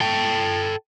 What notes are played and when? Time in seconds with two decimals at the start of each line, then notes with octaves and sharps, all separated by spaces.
0.01 A4 G5